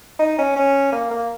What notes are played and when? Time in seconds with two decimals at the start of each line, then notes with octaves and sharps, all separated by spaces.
0.19 D#4
0.38 C#4
0.56 C#4
0.92 A#3
1.11 A#3